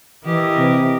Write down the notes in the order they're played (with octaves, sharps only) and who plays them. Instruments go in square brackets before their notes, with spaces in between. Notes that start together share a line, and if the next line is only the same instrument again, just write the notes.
[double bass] E3 [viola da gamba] G4 A#4 D#5
[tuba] C3